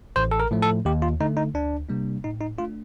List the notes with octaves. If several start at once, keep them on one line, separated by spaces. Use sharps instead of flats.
A1 C5
A4
A#4
A2 F3 A3
A4
D#2 G4
F4
D3 A3 D#4
D#4
D2 D4
C3 G3 A#3 D4
A2 D#4
D#4
A3 D4 F4